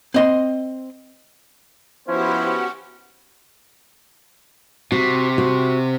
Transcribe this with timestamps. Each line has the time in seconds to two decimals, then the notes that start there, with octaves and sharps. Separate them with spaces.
0.14 C4 D#5 C6
2.09 F3 B3 C#4 E4 F#4 G4 C5 F#5
4.92 C3 F#4
5.38 F#4